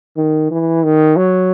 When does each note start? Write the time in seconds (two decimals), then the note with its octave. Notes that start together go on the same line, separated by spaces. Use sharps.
0.17 D#3
0.51 E3
0.83 D#3
1.16 F#3